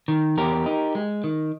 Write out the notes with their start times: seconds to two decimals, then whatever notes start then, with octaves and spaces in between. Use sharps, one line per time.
0.08 D#3
0.37 E2 G4 A#4
0.66 D#4
0.95 G#3
1.24 D#3